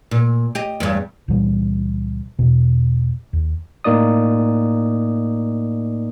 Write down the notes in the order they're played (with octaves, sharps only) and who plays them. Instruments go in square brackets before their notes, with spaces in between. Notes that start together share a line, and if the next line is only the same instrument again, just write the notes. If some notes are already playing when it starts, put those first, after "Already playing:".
[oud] A#2
G4 D#5
E2 G2
[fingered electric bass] C#2 A#2 E3 G3
E2 B2
D#2
[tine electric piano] A2 A#3 D#4 D5 D#6